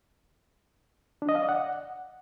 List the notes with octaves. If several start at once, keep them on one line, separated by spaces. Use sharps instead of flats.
D4
D#5
F5
D5
F#5